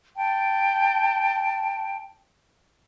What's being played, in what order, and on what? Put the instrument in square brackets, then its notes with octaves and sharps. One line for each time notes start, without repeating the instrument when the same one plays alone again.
[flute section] G5 A5